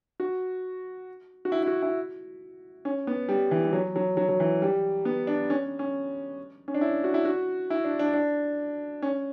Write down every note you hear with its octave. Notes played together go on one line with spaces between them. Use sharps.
F#4
F#4
E4
E4
F#4
E4
C#4
B3
G3
E3
G3
F#3
F#3
F#3
F#3
E3
G3
B3
D4
C#4
C#4
C#4
D4
E4
F#4
E4
F#4
E4
D4
D4
D4
C#4